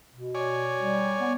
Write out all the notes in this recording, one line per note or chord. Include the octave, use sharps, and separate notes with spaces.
B2
C#5 D5 G#5
G3
B3